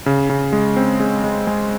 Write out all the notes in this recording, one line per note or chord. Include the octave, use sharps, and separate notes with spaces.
C#3
C#3
G#3
C4
G#3
G#3
G#3